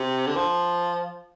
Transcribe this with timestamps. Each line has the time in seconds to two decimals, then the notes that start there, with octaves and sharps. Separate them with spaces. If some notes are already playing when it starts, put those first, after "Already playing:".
Already playing: C3
0.27 D3
0.36 F3